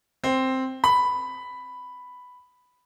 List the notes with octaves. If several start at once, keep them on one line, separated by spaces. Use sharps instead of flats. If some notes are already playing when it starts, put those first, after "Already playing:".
C4
B5